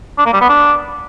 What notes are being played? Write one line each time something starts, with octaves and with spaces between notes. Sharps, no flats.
D4
A#3
G3
B3
D4